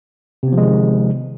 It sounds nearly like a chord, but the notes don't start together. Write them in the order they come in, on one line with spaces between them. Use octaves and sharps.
C3 B3 F3 G#3 D#3